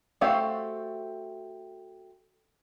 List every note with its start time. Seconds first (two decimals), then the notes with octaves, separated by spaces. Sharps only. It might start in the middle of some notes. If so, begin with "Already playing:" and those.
0.21 A3 C4 F#4 G4 F5